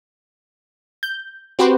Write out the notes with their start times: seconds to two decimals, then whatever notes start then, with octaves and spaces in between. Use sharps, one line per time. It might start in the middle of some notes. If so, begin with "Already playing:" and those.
1.03 G6
1.59 C4 F#4 G4 B4 C5